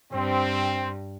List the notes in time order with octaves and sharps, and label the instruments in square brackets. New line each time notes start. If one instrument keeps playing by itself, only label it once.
[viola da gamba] G2 [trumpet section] C4